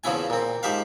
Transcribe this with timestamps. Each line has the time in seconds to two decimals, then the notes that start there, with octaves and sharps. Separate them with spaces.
0.04 E2 C#3 F3 C#4 E4 G#5
0.30 A#2 C4
0.63 G#2 F3 G4 E5 F5